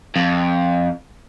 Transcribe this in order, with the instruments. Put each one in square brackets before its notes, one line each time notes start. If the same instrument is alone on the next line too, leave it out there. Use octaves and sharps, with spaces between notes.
[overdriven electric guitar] F2